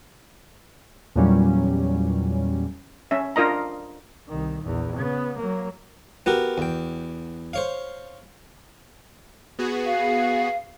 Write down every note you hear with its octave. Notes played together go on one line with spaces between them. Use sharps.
E2 A#2 F#3 G3 C#4
C#4 E5
D4 F4 A#4 D#5 A#5
C2 D#3
A#1 E2
C#3 B3
F#3 A#3
B3 F#4 G4 A#4
E2 G5
C5 C#5 F5
B3 F#4 G#4
F5